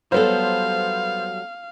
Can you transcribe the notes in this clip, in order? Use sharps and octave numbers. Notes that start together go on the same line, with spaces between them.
F#3 G3 B3 A4 C5 F5